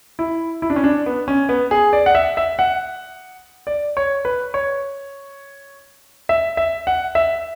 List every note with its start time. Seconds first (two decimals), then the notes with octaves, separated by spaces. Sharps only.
0.19 E4
0.62 E4
0.70 D4
0.76 C#4
0.84 D4
1.06 B3
1.28 C#4
1.49 B3
1.71 G#4
1.93 D5
2.06 F#5
2.15 E5
2.37 E5
2.59 F#5
3.67 D5
3.97 C#5
4.25 B4
4.54 C#5
6.29 E5
6.57 E5
6.87 F#5
7.15 E5